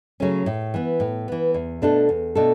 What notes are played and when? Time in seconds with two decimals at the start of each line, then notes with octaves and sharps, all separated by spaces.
0.20 C#3 F#3 A3 C#4
0.46 A2
0.74 E3 B3
1.00 A2
1.28 E3 B3
1.54 E2
1.82 B2 A3 D4 A4
2.09 E2
2.35 B2 A3 D4 A4